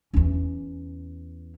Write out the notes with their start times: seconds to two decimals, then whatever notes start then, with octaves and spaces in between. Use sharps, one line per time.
0.14 E2 C#4